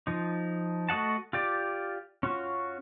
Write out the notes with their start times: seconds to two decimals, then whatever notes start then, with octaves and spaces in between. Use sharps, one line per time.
0.07 F3 D#4
0.89 A3 F#4 D#5 F#5 A5
1.33 F4 G4 D5
2.23 C#4 F4 F#4